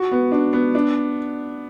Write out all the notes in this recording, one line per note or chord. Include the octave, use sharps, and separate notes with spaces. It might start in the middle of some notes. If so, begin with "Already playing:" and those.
Already playing: F#4
B3
D4
B3
D4